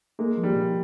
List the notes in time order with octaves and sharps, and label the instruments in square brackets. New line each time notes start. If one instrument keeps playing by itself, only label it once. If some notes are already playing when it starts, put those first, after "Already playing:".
[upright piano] G#3 [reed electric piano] A#3
[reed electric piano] F3
[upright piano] G3
[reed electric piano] A#2